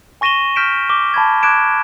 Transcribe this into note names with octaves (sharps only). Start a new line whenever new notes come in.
G#5 C#6 A#6 D#7 E7 G7
F6 G6 B6 D7 E7
D6 G7
A5 B5 G6 G#6
D6 F#6 G#6 D7 E7